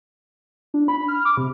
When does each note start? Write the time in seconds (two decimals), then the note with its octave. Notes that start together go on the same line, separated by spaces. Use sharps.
0.74 D4
0.88 B5
1.08 F6
1.25 D6
1.37 C3